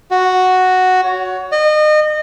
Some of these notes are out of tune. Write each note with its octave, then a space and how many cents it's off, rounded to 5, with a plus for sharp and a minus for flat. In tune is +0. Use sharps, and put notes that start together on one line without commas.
F#4 +0
C#5 +20
D#5 -30